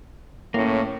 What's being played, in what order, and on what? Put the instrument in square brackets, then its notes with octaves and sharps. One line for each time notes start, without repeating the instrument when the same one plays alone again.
[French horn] A2 [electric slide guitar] A#3 C#4